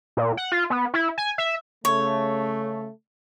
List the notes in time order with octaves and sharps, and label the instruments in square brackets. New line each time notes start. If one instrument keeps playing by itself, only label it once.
[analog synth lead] A#2
F#5
F4
B3
E4
G#5
E5
[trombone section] C#3 A3 [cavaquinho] C#5